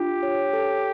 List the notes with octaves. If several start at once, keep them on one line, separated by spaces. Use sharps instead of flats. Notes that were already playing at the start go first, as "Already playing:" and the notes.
Already playing: D4 F4 G4
C#5
A4